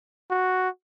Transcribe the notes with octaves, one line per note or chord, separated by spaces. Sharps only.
F#4